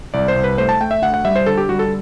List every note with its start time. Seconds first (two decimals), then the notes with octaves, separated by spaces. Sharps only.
0.14 C2 D5
0.28 C5
0.36 C2
0.44 B4
0.58 A3 C5
0.69 A5
0.80 A3 G5
0.91 E5
1.02 D2 F#5
1.14 F#5
1.25 G3 E5
1.36 C5
1.46 D3 A4
1.57 G4
1.69 G3 F#4
1.79 A4